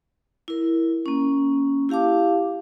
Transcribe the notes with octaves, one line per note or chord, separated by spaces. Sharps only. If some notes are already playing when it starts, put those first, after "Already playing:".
E4 A#4
A#3 C#4
E4 G4 F5 A5 D6